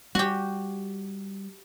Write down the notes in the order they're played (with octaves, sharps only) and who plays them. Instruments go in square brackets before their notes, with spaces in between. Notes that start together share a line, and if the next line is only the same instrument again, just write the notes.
[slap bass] G3 [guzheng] F#4 G4